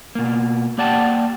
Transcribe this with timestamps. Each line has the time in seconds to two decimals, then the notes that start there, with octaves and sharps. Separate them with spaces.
0.15 B2 A#3
0.78 A#3 G4 D5 F#5 G5 A5